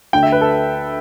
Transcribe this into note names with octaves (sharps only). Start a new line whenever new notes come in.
D2 D3 G5
E5
B4
A4